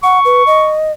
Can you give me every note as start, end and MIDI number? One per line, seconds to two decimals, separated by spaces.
0.03 0.19 78
0.03 0.73 85
0.25 0.43 71
0.47 0.92 75